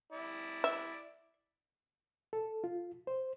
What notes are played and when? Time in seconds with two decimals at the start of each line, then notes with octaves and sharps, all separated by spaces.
0.12 E4 D5
0.64 E5
2.33 A4
2.64 F4
3.07 C5